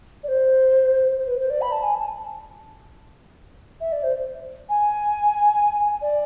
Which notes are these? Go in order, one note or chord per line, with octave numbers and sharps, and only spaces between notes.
D5
C5
C5
B4
C5
D5
B5
A5
G#5
A5
E5
D5
C5
G#5
D5